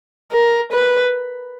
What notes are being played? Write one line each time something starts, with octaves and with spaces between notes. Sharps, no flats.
A#4
B4